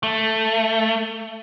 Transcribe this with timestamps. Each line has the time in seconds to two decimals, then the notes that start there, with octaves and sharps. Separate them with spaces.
0.03 A3